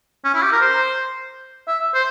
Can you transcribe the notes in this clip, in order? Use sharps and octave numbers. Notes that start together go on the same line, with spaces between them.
C#4
E4
G4
A#4
C5
E5
C5